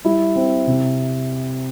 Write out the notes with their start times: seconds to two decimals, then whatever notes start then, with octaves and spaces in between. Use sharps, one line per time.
0.05 G3 E4
0.36 C4
0.67 C3